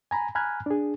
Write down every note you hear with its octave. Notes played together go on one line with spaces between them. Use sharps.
G#5 A#5 B5
G#5 A#5 B5 F6 F#6 G#6
D4 G#4